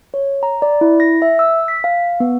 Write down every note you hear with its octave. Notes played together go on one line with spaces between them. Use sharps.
C#5
A#5
D5
E4
A#6
E5
E6
B6
F5
B3